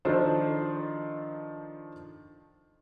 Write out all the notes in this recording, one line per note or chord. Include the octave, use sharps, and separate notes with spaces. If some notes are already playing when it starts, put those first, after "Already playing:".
D#3 F3 D4 A4 C5